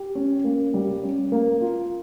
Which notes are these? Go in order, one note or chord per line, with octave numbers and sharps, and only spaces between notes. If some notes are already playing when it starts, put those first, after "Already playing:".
Already playing: G4
C#4
A#3
G3
C#4
A#3
F4